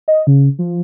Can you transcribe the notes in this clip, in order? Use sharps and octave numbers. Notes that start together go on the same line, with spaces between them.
D#5
C#3
F3